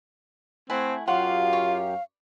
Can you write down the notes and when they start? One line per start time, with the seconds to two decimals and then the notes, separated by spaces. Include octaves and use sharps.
0.70 A3 C4 E4 F#5 G#5
1.08 F#2 F#3 F4 G4 C#5 F5 F#5 C6
1.53 C#5